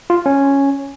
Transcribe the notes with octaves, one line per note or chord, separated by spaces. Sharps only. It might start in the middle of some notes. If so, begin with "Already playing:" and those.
F4
C#4